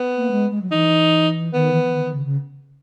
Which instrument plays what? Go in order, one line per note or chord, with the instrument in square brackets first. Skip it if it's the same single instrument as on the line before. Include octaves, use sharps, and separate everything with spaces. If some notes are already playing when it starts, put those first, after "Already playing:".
Already playing: [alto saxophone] B3
[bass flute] A#3
G#3
G#3
F#3
[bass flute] E3 [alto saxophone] D#4
[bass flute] D#3 [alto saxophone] B3
[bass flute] E3
E3
D#3
D#3
C#3
C#3